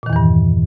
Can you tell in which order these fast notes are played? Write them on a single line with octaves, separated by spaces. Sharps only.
A#2 D#3 E2 E3 G2